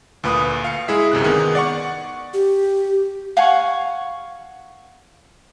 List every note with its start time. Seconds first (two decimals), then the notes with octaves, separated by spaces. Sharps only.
0.24 D2 A#2 B4 F5 D#6
0.64 F5 C#7
0.88 G#3 E4 G#4 E5
1.12 G1 F#2 C3 F#6
1.24 D#3 B3 G#4
1.55 D5 F#5 C#6
2.34 G4
3.37 F5 F#5 G#5 C#6